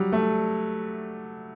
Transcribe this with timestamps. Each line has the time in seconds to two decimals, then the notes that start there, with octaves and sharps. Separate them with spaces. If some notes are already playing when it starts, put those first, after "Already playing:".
Already playing: F#3 G3
0.12 A3